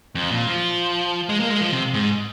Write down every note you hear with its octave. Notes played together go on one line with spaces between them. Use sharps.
F2
A#2
F3
G#3
A#3
G#3
F3
C3
G#2